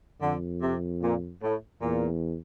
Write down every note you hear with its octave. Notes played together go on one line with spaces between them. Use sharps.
F2 D3
C3
A#2
A2
E2 A#2